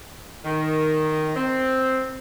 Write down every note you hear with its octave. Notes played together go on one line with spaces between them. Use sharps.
D#3
C4